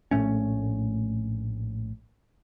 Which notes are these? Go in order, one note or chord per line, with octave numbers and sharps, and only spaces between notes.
A#1 A2 A3 C#4